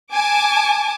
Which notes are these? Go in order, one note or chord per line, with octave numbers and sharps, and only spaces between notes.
G#5 A5 D6